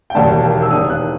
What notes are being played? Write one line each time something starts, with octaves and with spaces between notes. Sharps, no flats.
G5
E1 D#2 D#3 G3 A5
E6
E1 E2 D#3 G3 D#6
F#6